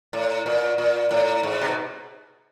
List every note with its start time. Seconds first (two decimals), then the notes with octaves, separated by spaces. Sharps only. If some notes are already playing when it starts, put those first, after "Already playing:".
0.13 A2
0.46 A#2
0.78 A#2
1.11 A2
1.43 G#2
1.61 C3
1.68 B2